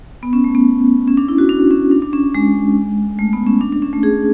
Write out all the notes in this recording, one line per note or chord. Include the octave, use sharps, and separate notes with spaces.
B3
C#4
A3
B3
C#4
D4
E4
F#4
D4
C#4
D4
D4
C#4
G#3
A3
B3
C#4
D4
D4
C#4
A3
G#4